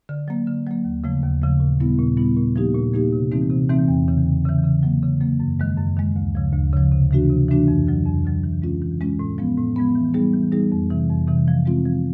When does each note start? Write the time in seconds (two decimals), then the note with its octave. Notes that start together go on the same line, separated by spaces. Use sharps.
0.09 D3
0.28 F#3 A#3
0.47 D3
0.66 F#3 A#3
0.84 D#2
1.04 C#3 F3 A3
1.23 D#2
1.42 C#3 F3 A3
1.60 A#2
1.80 G3 B3 E4
1.99 A#2
2.17 G3 B3 E4
2.36 A#2
2.56 F3 A#3 D#4 G4
2.75 A#2
2.94 F3 A#3 D#4 G4
3.13 C3
3.31 E3 A3 C4 D#4
3.50 C3
3.69 E3 A3 C4 D#4
3.88 E2
4.08 C#3 E3
4.26 E2
4.46 C#3 E3
4.64 C#3
4.83 F#3 A#3
5.03 C#3
5.21 F#3 A#3
5.40 F#2
5.60 D#3 G#3
5.78 F#2
5.97 D#3 G#3
6.16 D2
6.35 C#3 F3
6.53 D2
6.73 C#3 F3
6.92 C3
7.11 E3 A3 D4 F#4
7.30 C3
7.49 E3 A3 D4 F#4
7.68 F2
7.87 D3 F#3
8.05 F2
8.25 D3 F#3
8.44 E3
8.62 G#3 C#4 F4
8.82 E3
9.01 G#3 C#4 F4
9.19 A2
9.38 F3 G#3 B3
9.58 A2
9.76 F3 G#3 B3
9.95 E3
10.14 G3 B3 D#4 G#4
10.34 E3
10.52 G3 B3 D#4 G#4
10.72 F2
10.90 C3 E3
11.10 F2
11.28 C3 E3
11.48 F3
11.66 G#3 C4 F4
11.85 F3